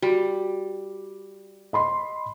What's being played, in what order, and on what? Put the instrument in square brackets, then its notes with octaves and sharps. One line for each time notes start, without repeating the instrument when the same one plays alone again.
[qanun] G3 [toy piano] F#4
[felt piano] D#5 B5 C6